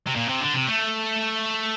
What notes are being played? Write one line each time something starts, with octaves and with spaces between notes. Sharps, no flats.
C3
A#2
C3
D3
C3
A3